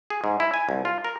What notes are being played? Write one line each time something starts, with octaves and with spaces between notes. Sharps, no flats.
G#4
G#2
E4
G#5
C2
F4
A#4